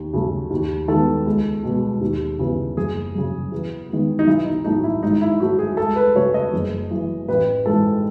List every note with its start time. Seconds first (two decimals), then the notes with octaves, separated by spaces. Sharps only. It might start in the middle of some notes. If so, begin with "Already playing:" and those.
Already playing: D#2
0.13 C#3 F#3 A3
0.50 D#2
0.88 D#3 G#3 B3 A4
1.26 C#2
1.63 B2 G#3 B3
2.01 D#2
2.39 C#3 E3 B3
2.77 F#1 G#4
3.15 F#2 C#3
3.51 E2
3.90 D#3 G#3 B3
4.19 D#4
4.27 B1 E4
4.46 D#4
4.64 A2 F#3 A3 D#4
4.83 E4
5.03 G#1 D#4
5.21 E4
5.40 G#2 F#3 A3 F#4
5.59 G#4
5.77 C#2 A4
5.96 B4
6.15 C#3 F#3 A3 C#5
6.34 D#5
6.53 F#1
6.91 F#2 E3
7.28 A1 B4
7.66 G#2 E3 G#3 A4